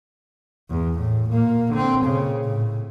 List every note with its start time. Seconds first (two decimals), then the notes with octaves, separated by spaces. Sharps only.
0.70 E2
1.00 A2
1.30 A#2 A#3
1.72 D3 C4
2.03 A#2 C#3
2.44 A2